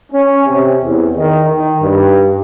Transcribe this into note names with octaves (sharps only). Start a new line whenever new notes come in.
C#4
C3
E2
D#3
D#3
G2